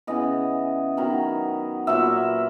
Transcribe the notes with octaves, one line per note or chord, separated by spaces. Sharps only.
C#3 E3 B3 D#5
D#3 F#3 B3
A#2 F#3 B3 E5